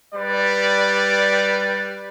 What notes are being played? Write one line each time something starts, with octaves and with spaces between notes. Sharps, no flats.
G3 B4 D5